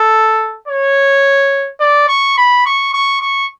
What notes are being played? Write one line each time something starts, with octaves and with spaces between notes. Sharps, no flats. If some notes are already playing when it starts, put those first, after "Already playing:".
Already playing: A4
C#5
D5
C#6
B5
C#6
C#6
C#6